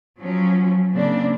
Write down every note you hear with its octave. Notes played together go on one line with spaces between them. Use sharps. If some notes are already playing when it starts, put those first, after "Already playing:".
F3 F#3 C#4
C#3 A#3 C4 D4